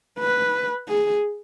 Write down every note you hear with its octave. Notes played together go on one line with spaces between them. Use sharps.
B4
G#4